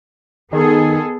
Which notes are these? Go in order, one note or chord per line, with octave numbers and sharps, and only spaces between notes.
D#3 B3 G#4 A4